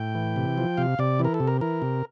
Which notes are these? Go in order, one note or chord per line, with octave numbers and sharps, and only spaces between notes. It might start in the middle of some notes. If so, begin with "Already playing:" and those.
Already playing: A2 G5
E3
C3
F3
C3 F5
C3 D5
E3
A#4
A4
C3
A#4
E3 A#4
C3